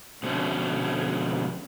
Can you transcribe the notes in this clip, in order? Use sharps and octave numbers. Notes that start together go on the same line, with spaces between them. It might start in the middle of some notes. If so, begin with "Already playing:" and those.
F2 B2 D3 C4 C#4